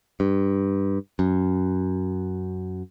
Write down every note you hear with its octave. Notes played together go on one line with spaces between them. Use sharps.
G2
F#2